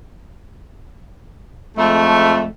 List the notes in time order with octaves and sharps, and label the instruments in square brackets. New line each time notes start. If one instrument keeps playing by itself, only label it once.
[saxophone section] F2 G#3 A3